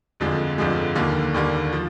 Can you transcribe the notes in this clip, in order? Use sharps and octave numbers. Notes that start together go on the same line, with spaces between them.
G1 F2 D3 F3 G#3
G1 F2 D3 F3 G#3
D#2 D3 G3 A#3
D#2 D3 G3 A#3
F3